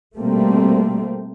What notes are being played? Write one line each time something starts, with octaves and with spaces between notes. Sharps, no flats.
B2 G3 A3 A#3 C4